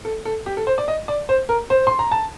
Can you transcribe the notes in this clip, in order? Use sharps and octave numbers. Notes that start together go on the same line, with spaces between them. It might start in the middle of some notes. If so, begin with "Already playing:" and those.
A4
A4
G4
A4
C5
D5
D#5
D5
C5
A#4
C5
C6
A#5
A5